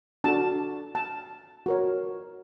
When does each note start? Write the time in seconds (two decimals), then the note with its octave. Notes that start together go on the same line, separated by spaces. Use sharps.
0.24 D4 F#4 A4 A5
0.95 A5
1.66 F#4 A#4 C#5